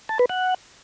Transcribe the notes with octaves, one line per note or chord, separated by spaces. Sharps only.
A5
B4
F#5